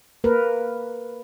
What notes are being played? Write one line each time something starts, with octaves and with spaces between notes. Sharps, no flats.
A#3 A#4 B4